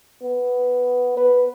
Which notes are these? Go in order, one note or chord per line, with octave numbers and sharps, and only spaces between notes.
B3
B4